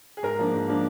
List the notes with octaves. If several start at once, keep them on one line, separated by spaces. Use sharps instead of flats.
G#4
G#2 A#4
F3 A#3 D4
G#2
F3 A#3 D4